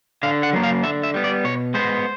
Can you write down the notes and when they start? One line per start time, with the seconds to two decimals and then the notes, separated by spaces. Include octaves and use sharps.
0.23 D3 F5
0.43 F#5
0.53 F#3 A#3
0.63 F5
0.83 D3 E5
1.03 E5
1.14 G3 B3
1.24 D5
1.44 B2 C#5
1.74 G#3 B3 C5